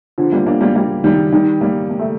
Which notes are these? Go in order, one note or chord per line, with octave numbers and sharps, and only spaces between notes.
D3 F3
G3 A#3
A#3 D4
G3 A#3
G3 A#3
D#3 G3
D#3 G3
G3 A#3
A#3
A3